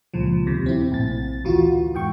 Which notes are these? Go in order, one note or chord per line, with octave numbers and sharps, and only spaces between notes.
C#2 A#2 F3
D#2 C3
C4 E4
A#1 A2 A6
D2 E3 F4 F#4
E2 G#2 G5 C#6